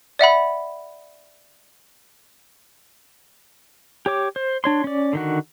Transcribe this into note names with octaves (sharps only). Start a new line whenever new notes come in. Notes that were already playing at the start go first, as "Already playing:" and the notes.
D5 E5 F#5 B5
G4 C#5 D6
C5
D4 C#5 C6
C#4 D5
D3 D#3 F#4